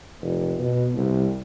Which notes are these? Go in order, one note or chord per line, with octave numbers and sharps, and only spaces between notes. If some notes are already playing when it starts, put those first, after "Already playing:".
F1
B2
C2